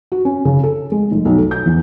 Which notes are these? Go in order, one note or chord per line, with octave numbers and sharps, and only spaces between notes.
F#4
C#4
C#3
A4
G#3
F1
B1
A4
G6
E2